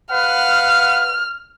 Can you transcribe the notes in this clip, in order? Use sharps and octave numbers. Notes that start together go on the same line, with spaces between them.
B4 F5 F#5 F6